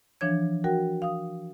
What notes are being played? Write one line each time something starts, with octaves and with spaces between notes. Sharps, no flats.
E3 F3 D4 C#5 G#6
F#4 A#4 F#5 G5
F5 D#6